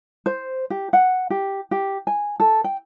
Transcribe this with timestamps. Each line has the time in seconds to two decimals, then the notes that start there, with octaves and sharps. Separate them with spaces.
0.26 C5
0.70 G4
0.93 F#5
1.30 G4
1.71 G4
2.07 G#5
2.40 A4
2.64 G5